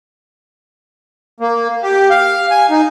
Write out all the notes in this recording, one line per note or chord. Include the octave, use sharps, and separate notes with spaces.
A#3
G4
F5
G#5
D#4